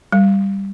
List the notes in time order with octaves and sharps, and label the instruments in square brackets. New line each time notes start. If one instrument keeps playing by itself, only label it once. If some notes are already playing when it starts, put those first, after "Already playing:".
[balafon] G3